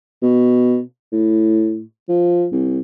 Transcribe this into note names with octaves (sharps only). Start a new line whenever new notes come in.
B2
A2
F3
C2